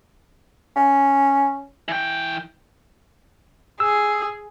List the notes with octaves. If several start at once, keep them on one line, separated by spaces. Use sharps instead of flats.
C#4
E3 G5
G#4 E6